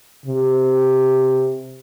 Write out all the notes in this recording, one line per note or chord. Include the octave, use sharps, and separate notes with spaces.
C3